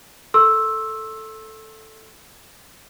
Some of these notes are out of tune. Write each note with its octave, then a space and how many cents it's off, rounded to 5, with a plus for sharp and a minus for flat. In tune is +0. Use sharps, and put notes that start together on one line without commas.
A4 +0 C6 +40 E6 +0